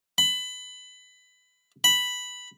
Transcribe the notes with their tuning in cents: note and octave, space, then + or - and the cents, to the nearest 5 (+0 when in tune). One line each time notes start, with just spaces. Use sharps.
B5 +20
B5 +0